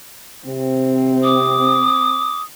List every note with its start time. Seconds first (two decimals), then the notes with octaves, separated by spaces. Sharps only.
0.47 C3 C4
1.23 D6 D#6